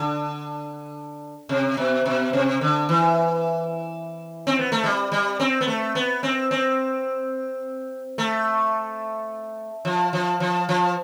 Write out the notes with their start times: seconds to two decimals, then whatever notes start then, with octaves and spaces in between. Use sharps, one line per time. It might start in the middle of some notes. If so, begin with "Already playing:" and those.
Already playing: D3
1.49 C3
1.77 B2
2.06 B2
2.33 C3
2.61 D3
2.89 E3
4.47 C4
4.59 B3
4.72 A3
4.84 G3
5.12 G3
5.40 C4
5.61 B3
5.67 A3
5.95 B3
6.23 C4
6.51 C4
8.18 A3
9.85 F3
10.13 F3
10.40 F3
10.69 F3